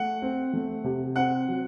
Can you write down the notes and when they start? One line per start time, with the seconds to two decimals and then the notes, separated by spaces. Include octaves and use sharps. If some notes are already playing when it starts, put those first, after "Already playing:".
Already playing: A3 F#5
0.22 C4
0.53 A3
0.84 C3
1.16 C4 F#5
1.48 F#3